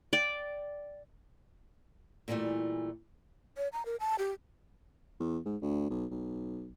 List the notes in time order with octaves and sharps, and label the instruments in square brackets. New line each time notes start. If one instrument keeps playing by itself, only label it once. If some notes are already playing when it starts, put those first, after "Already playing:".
[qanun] D5 G5
[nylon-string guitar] A#2 D3 E3 G3 A3
[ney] C#5
A#5
A#4
A5
G4
[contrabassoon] E2
G#2
D2
B1
B1